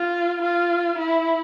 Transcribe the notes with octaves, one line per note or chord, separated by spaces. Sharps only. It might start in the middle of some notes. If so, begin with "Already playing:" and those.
Already playing: F4
F4
E4